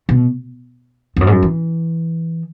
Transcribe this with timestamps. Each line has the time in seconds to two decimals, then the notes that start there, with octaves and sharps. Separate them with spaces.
0.09 B2
1.16 E2
1.21 F#2
1.27 G#2
1.32 F#2
1.43 E3